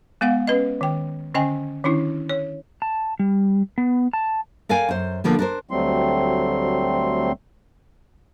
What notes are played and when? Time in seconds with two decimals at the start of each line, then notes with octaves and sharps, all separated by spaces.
0.21 G#3 B3 F5 F#5
0.47 C#4 B4 D#5
0.81 D#3 G5
1.34 D3 C#4 D#5 G5 G#5
1.84 D#3 C#4 D4 E4
2.29 C#5
2.82 A5
3.19 G3
3.78 B3
4.13 A5
4.69 A#4 D5 F5 G5 G#5
4.89 F#2 C5
5.24 D3 F3 A#3 B3
5.39 D4 A#4 C5
5.71 D2 F#3 G3 A3 C4 C6